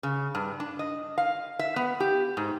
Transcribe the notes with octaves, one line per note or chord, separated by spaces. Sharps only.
C#3
G2
D4
D#5
F5
E5
B3
G4
G#2